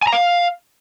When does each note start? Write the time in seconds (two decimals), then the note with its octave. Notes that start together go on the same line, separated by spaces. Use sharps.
0.02 G#5
0.07 A#5
0.12 F5